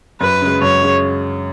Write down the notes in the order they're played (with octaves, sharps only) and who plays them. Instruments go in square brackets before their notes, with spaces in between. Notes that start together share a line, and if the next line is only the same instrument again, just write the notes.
[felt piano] F#2 [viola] B4
[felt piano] C#3 G#3
[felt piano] F#2 [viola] C#5
[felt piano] C#3 G#3